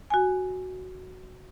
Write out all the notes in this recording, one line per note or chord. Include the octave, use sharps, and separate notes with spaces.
F#4 G#5